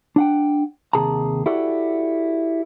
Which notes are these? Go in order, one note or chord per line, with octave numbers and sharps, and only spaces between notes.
D4 F#5 G5
D#2 G#2 C3 G#4 A5 A#5
E4 F#4 G4 A4 D5 F#5